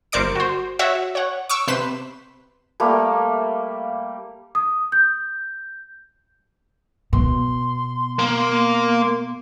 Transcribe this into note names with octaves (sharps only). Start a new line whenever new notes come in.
G1 A#4 C5 D5 D6 C#7
F#4 C5
F#4 C#5 E5 F#5
C#5 F#5
C#6 D6 E6
C3 B4 C5 B6 E7
G3 A3 A#3
D#6
G6
B2 C6
A#3